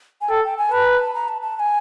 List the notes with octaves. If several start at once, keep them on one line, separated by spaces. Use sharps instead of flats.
G#5
A4 G5
G5
G#5
B4 A5
A#5
A5
A#5
A5
A5
A5
G#5